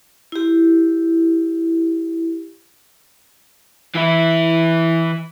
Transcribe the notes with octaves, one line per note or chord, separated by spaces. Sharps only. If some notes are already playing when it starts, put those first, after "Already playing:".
E4 G4
E3 E4